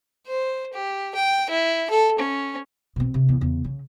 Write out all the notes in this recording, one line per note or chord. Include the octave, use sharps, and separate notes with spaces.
C5
G4
G5
E4
A4
C#4
B2 C4
C3
E2
E2 C#3
C#3